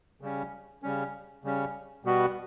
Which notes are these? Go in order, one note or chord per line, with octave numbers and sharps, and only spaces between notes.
C#3 G3 C#4
C#3 G3 C#4
C#3 G3 C#4
B2 G3 B3 F#4